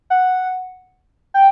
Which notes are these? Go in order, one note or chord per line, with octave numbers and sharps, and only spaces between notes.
F#5
G5